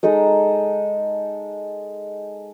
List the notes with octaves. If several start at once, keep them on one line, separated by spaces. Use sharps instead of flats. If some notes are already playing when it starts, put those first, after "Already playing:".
G#3 D#4 A4 D#5